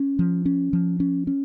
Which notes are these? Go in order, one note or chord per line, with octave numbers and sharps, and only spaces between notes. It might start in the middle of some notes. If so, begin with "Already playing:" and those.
Already playing: C#4
F3
C#4
F3
C#4
C#4